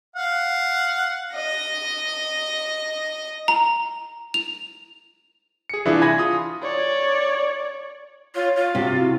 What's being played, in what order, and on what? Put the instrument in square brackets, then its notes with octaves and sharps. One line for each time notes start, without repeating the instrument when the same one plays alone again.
[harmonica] F5 F#5
[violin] D#5 A#6
[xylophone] A#5
F7
[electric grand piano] G#4 C#7
C2 E3 D4 E4 F4 G#4
G#5 B5 G#6 A#6
F4 D#6
[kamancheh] C#5 D5
[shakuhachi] F4 [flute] C#5
[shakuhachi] F4 [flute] F5
[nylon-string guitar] C3 [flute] F#4
[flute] E4